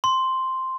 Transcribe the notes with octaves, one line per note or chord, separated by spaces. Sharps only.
C6